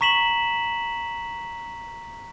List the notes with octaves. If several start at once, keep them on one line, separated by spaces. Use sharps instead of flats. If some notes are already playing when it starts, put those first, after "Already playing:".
A#5 C#6 B6 E7 F#7